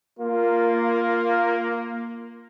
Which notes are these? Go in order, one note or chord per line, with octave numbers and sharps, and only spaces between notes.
A#3 F4